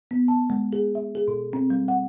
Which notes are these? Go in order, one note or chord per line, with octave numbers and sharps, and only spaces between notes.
B3
A5
G#3
G#4
E5
G#4
B2
C4
G3
F#5